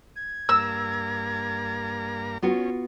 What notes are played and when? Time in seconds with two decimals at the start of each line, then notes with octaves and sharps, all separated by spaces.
0.16 G#6
0.49 G2 A#3 A#5 E6
2.42 B3 C#4 F4 F#4